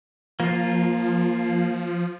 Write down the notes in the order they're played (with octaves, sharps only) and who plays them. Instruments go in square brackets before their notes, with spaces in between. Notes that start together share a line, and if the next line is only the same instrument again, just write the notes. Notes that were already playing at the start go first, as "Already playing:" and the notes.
[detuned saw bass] F3 [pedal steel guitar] A#3 F4